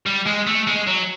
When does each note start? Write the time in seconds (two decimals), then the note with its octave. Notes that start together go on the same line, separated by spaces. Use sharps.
0.06 G3
0.26 G#3
0.47 A3
0.67 G#3
0.87 F#3